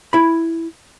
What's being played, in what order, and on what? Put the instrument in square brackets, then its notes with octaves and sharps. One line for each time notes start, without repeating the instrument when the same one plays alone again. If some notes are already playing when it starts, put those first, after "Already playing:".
[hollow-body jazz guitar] E4 B5